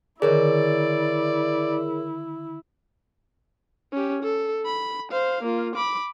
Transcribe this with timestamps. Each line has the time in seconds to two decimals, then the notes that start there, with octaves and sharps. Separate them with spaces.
0.22 D3 D#3 E4 G#4 A#4 C#5 D5
3.93 C#4 G4
4.23 A4
4.65 B5
5.11 C5 F5
5.43 A#3 F4
5.75 B5 D6